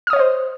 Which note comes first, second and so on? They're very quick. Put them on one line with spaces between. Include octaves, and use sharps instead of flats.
F6 D#6 C#5 D#5 C5